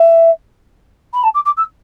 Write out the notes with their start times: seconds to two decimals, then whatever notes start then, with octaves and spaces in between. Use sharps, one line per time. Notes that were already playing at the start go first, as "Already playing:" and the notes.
Already playing: E5
1.13 B5
1.23 A5
1.34 D6
1.45 D6
1.57 E6